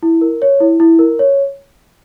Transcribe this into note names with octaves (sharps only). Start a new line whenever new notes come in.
E4
A#4
C#5
E4
E4
A#4
C#5